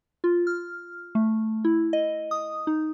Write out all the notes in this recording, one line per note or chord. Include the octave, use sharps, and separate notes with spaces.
F4
F6
A3
E4
D#5
D#6
D#4